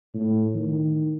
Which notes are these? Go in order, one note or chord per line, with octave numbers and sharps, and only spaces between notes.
A2
D#3